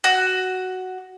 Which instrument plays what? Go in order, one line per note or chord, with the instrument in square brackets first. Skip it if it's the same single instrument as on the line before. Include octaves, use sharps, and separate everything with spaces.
[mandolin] F#4